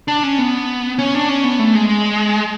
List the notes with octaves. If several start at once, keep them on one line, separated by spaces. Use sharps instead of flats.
D4
C#4
B3
C#4
D4
C#4
B3
A3
G#3